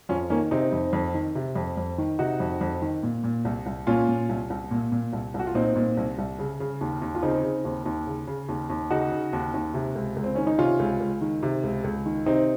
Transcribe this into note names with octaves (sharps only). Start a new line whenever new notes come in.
F2 C#4 F4
D#3 A#3 C#4
C3 C4 D#4
F2
F2
D#3
C3
F2
F2
D#3
C3 D#4 F#4
F2
F2
D#3
A#2
A#2
C2
C2
A#2 C#4 F4
A#2
C2
C2
A#2
A#2
C2
C2
F#4
F4
A#2 C4 D#4
A#2
C2
C2
C#3
C#3
D#2
D#2
F4
C#3 C4 D#4
C#3
D#2
D#2
C#3
C#3
D#2
D#2
C#3 D#4 F#4
C#3
D#2
D#2
C3
C#2
C#2
C4
D#3 C#4
D#4
C3 C#4 F4
C#2
C#2
D#3
C3
C#2
C#2
D#3
C3 C4 D#4